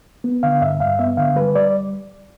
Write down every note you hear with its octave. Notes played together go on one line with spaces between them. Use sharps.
B3
D3 F5
G2 E5
G2 F5
B3 E5
D3 F5
G3 B4
G3 D5